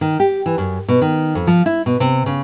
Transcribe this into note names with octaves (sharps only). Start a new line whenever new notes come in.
D#3
G4
E3
F#2
B2
D#3
F2
F3
E4
B2
C3
C#3